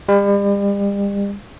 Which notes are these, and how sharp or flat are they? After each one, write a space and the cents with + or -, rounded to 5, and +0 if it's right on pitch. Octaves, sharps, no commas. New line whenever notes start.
G3 +40